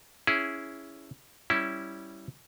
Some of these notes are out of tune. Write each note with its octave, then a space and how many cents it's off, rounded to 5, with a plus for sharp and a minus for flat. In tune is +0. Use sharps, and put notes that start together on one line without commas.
C#4 +10 E4 +0 G#4 +0
G3 +0 C#4 +0 E4 +0